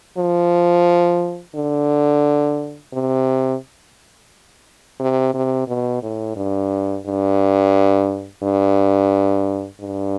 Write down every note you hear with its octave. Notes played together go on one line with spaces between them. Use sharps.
F3
D3
C3
C3
C3
B2
A2
G2
G2
G2
G2